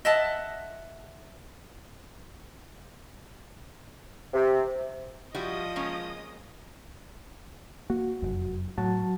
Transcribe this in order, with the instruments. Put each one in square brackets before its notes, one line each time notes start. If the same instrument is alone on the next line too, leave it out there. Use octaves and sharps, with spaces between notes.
[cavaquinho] D#5 E5 F#5 A5
[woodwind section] C3
[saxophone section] F3 [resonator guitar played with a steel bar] G3 E4 F#4 [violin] D#5 D#6
[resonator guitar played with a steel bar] G#3 A#3 C#4
[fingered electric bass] A#3 [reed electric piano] F#4
[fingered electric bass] F1 F#2
[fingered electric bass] A2 [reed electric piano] F#3 F#4 A5